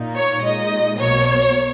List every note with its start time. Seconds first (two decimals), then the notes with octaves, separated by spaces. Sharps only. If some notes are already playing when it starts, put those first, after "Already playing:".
Already playing: A#2 A#3 D#4
0.14 C#5
0.42 A#2 G#3 D#4 D#5
0.98 B1 B2 F#3 A#3 C#5